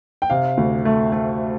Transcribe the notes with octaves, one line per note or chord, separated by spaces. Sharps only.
G5
C3 F5
D2
A3
A3